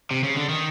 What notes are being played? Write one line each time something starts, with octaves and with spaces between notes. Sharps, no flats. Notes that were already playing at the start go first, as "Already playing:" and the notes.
C3
C#3
D3
D#3